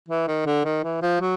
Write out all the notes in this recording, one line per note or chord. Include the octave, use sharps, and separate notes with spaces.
E3
D#3
D3
D#3
E3
F3
F#3